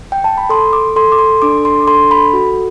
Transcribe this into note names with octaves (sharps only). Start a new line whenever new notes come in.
G5
A5
B5
A4 C6
D6
A4 C6
D6
C6
D4 D6
C6
A4 C6
B5
F#4